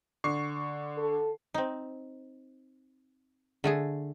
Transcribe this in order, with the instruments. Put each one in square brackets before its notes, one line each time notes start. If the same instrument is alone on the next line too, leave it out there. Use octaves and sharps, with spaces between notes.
[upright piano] D3 C#6 C7
[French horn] A4
[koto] C4 D#4
D3 A3 G#4